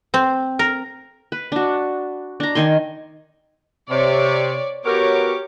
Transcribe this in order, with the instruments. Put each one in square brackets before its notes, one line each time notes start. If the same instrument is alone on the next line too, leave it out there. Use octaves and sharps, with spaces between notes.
[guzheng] C4
A#4
[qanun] B4
D4 F#4
D4 A#5
D#3 G#5 C6
[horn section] C3 [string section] C#5 D5
[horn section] B3 F#4 A#4 [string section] G4 C#5 D6